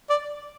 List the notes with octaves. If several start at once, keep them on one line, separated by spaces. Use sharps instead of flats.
D5